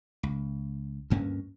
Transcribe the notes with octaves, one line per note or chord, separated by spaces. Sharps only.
C#2
D2 G2 A#3 C#4